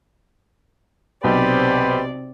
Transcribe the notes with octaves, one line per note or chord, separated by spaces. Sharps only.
B1 C3 G4 B4 C5 D5